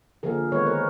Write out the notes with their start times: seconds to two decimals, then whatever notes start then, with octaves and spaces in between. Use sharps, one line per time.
0.23 D3 F3 A#3 G#4 A#4
0.52 D#3 G#3 B3 B4 C#5
0.67 A#4 C5